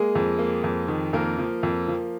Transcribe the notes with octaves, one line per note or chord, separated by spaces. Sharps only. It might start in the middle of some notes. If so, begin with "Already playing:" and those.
Already playing: G#3 A#3 G#4
F2
A#3
F2
D#3
F2 A#3 A#4
F3
F2
F3